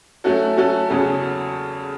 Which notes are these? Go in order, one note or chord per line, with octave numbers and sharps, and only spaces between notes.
F#3 A3 C#4 F#4 A4
F#3 A3 C#4 F#4 A4
E2 C#3 F#3 C#4 A4